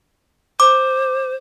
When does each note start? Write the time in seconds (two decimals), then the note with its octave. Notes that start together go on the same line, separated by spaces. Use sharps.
0.60 C5 D6